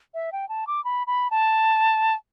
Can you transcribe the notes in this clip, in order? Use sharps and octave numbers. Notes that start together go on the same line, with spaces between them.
E5
G5
A5
D6
B5
B5
A5